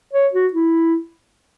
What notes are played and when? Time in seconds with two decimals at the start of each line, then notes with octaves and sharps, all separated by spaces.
0.13 C#5
0.33 F#4
0.53 E4